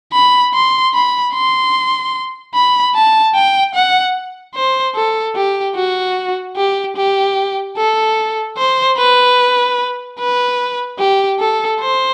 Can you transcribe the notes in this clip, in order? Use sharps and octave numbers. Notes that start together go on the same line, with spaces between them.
B5
C6
B5
C6
B5
A5
G5
F#5
C5
A4
G4
F#4
G4
G4
A4
C5
B4
B4
G4
A4
C5